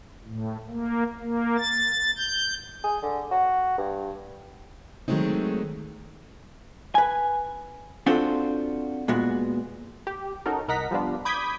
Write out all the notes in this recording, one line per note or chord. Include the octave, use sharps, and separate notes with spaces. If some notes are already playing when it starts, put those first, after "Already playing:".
A2
A#3
A#3
A6
G6
G#4
D3
F#4
G2
D#3 F#3 G#3 A3 C4 D#4
B4 G#5
C4 D4 F4 F#4 A4 C5
A#2 G#3 B3 F#4
G4
C#4 D#4 F#4 A4 A#4
C2 A#4 D#5 F#5 A#5 B6
F3 G3 B3 D4 F4
B5 D6 D#6 G6 G#6 B6